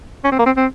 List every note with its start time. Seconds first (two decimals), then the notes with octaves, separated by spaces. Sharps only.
0.24 C#4
0.32 C4
0.39 A#3
0.46 C4
0.57 C4